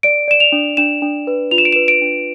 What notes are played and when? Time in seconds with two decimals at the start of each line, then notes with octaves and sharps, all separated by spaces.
0.03 D5 D7
0.28 D5 E7
0.40 F7
0.52 D4
0.77 D4 E7
1.02 D4
1.27 B4
1.51 F4 F7
1.58 E7
1.65 D7
1.73 B4 E7
1.88 D7
2.01 D4